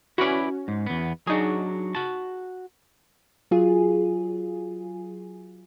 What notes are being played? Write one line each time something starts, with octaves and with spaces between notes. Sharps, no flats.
C#4 E4 F#4 B4 D5
G#2
E2 B3
F#3 D4 D#4 F#4 G#4
F#4 A5
F#3 F4 G#4